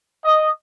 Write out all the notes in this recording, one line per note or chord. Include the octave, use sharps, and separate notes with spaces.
D#5